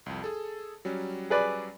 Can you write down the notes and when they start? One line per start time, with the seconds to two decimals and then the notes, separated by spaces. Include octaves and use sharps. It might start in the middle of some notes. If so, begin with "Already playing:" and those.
0.06 C2 F2
0.22 G#4 A4 A5
0.85 F#3 G3 C#4
1.30 G#4 B4 D5